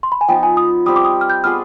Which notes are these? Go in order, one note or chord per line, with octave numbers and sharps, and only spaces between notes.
C6
B5
G#5
F3 B3 D#4 G5
G#5
D#6
G3 C4 G4 D#6
D6
D#6
F6
G6
B3 F4 G#4 F6